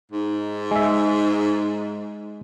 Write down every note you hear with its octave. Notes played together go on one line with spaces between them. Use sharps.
G#2 D#4
G#3 E5